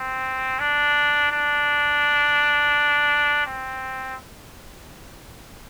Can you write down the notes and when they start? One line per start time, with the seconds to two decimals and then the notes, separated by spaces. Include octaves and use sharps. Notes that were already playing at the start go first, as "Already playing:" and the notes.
Already playing: C4
0.60 D4
1.32 D4
3.46 C4